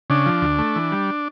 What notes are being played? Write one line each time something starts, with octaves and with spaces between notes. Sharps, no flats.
C#3 D4
F3
D2
A3
E3
G3